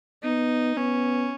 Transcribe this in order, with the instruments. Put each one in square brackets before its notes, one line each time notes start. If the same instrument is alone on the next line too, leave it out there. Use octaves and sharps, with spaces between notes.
[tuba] B3 [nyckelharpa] D#4
[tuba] B3 [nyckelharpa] C#4